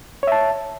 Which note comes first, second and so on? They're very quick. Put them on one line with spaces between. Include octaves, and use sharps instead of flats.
C#5 E5 A5